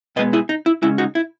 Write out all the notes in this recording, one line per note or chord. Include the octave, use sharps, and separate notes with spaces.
B2 G#3 B3 B4 D#5
E4 G#4
D#4
E4
C#3 G#3 C#4 E4
D#4 F#4
E4